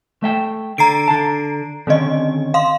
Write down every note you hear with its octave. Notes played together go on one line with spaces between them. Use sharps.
A3 E5 G5
D3 A#5 C7 D7
D3 A5
D3 D#3 C4 C#4 D#5
F5 C6